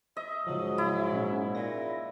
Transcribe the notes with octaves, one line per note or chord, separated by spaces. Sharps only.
D#5 E5
G#2 C#3 F3 F#3
E4
A#2 C#4
A#2 A#6